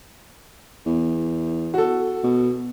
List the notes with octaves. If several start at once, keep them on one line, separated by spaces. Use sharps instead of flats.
E2
F#4 A4
B2